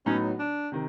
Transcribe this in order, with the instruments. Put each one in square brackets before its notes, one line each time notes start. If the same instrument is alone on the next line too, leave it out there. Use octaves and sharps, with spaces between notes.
[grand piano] A2 F#3 B3 D#4 [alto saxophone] C#4
[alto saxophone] D4
[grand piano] C3 D#3